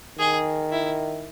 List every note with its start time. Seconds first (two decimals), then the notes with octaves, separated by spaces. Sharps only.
0.19 D#3 G#4
0.72 E4